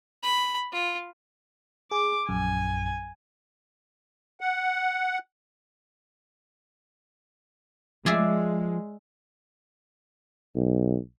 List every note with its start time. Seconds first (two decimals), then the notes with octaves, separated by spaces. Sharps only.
0.23 B5
0.72 F4
1.91 G#4 D6
2.29 A#1 F#2 G#5
4.41 F#5
8.06 F3 G#3 G#4 D5 E5
10.56 B1